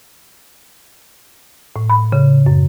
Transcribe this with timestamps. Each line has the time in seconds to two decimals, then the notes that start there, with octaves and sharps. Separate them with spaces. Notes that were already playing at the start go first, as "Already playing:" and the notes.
1.76 A2
1.90 B5
2.12 C#3
2.46 F#2